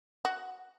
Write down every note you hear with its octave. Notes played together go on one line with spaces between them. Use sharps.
F#4